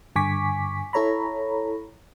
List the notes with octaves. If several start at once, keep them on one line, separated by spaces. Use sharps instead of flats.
G2 D3 G#5 C#6 D6 B6
E4 A4 C#5 A#5 B5